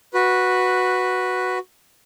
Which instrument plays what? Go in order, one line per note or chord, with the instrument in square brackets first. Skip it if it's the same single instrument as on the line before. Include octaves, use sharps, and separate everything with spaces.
[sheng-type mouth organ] F#4 B4